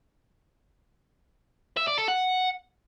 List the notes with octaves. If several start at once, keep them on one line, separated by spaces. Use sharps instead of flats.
E5
D5
A4
F#5